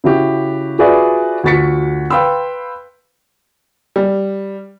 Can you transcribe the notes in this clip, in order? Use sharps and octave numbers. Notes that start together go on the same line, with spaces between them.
C#3 E4 F#4 G4
F4 F#4 G#4 B4 D5 E5
D2 F4 F#4 A6 B6 C#7
B4 F5 G5 B5 C6 E6
G3